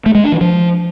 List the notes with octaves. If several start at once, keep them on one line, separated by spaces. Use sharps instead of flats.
A3
G#3
D4
E3
F3